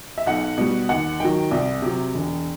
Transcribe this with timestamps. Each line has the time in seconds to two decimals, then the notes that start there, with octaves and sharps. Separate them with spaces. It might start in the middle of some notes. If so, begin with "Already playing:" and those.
0.18 E5
0.26 B1 F#5
0.58 B2 G3
0.89 D#2 F#5
1.20 D#3 F#3 G5
1.51 C2
1.82 C3 F#3
2.14 E1